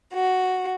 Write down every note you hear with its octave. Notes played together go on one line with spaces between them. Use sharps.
F#4